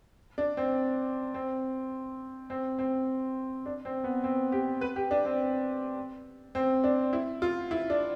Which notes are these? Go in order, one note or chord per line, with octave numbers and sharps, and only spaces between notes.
D4
C4
C4
C4
C4
D4
C4
B3
C4
G4
B4
G4
D4
C4
C4
D4
E4
F4
E4
D4